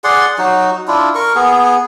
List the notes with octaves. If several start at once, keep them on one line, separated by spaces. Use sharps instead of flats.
G#4 D5 F#5 C6
F#3 D#4 F#4
D4 E4 F4
A#4 C#6
B3 G#4